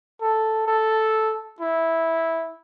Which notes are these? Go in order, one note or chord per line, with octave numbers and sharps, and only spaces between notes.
A4
A4
E4